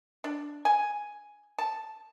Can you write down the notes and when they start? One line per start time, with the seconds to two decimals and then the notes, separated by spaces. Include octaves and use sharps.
0.24 D4
0.65 G#5
1.59 A5